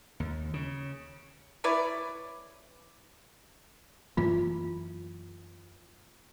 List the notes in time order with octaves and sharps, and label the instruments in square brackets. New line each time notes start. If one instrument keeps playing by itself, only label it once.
[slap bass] D#2
C#3
[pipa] E4 B4 C#5 D5
[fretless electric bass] F#2 E3 A#3 [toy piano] F4